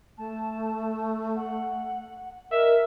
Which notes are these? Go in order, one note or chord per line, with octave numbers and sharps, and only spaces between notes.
A3 A5
F#5
A#4 D#5 E5